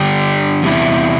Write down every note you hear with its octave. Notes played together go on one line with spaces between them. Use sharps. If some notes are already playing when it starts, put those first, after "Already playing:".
Already playing: D3 G3 D4 G4
E2 C3 G3 E4